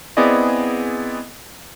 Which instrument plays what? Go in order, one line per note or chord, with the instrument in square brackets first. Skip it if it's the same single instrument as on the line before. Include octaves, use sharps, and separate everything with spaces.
[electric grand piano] B3 C4 E4 G#4 D5 D#5